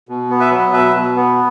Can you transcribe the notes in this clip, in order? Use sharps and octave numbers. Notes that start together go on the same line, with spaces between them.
B2
B3
B4 E5
F#3
B2 B4 E5
B2
B3